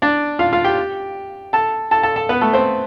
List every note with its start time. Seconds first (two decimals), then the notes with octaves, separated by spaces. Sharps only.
0.02 D4 D5
0.39 F4 F5
0.53 F4 F5
0.64 G4 G5
1.53 A4 A5
1.91 A4 A5
2.03 A4 A5
2.16 A4 A5
2.29 B3 B4
2.41 A3 A4
2.54 C4 C5